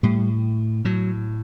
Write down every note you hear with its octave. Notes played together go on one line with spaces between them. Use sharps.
A2 G3
A2 F#3